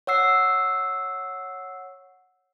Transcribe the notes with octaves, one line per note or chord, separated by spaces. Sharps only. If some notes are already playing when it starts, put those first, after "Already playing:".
C#5 F#5 E6 C7